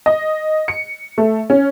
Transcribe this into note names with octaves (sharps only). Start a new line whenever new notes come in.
D#5
C#7
A3
C#4